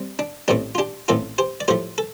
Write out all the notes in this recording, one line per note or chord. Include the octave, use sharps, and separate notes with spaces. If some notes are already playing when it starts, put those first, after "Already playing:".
Already playing: G3 C4
D4
A1 A2 A3 C4 D4 G4
F4
D4 G4
A1 A2 A3 C4 F4 A4
G4 C5
D5
A2 F3 A3 G4 C5
A4